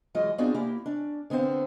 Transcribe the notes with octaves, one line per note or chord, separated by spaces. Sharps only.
E3 F#3 G#3 F4 D#5
B3 C4 D4 F4 F#4 G#4
A#3 E4 G4
C#4 D4
D3 B3 C4 C5 F5